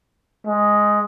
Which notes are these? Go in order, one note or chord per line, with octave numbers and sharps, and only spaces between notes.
G#3